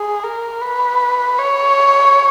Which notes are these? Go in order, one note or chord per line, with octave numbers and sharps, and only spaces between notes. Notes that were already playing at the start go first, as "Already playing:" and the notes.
Already playing: G#4
A#4
B4
C#5